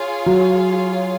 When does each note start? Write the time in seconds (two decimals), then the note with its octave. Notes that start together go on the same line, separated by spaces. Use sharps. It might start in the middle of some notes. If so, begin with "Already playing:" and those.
Already playing: F4 G#4 C#5 F5
0.26 F#3